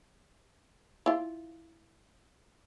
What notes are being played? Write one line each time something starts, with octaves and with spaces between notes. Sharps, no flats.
E4 F4